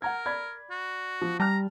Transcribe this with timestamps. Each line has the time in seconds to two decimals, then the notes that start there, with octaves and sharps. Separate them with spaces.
0.02 A#4 F#5 A#5 G#6
0.26 D5 B5 G#6
0.70 F#4
1.21 F3
1.40 G3 A5 A#5 F6